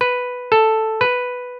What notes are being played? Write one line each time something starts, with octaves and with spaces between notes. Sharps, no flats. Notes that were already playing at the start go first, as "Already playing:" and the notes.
B4
A4
B4